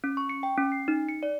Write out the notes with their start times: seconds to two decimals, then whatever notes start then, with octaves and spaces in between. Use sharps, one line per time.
0.04 C#4
0.17 C#6
0.29 C#7
0.43 G5
0.57 C#4
0.72 C7
0.88 D#4
1.09 C#7
1.23 D5